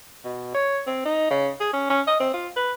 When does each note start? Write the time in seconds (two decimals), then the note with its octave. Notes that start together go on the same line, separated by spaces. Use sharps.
0.25 B2
0.54 C#5
0.87 C4
1.05 D#4
1.31 C#3
1.60 G#4
1.73 C#4
1.90 C#4
2.07 D#5
2.20 C4
2.34 F4
2.57 B4